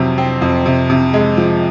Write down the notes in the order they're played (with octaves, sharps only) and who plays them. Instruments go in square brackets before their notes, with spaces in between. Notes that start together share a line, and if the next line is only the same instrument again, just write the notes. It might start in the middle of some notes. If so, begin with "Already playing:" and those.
Already playing: [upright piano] F2 C3 F#3 C4
C4
F2
C3
C3
G#3
F3